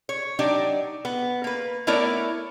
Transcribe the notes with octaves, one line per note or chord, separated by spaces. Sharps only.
C#5
F#3 D4 D#4 G4 D5
B3
A#3 B4
A3 B3 E4 A#4 C#5 D5